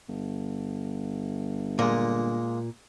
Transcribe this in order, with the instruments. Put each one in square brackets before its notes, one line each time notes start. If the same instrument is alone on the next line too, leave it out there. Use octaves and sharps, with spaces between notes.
[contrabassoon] G1
[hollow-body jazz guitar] A#2 [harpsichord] G#3 A#3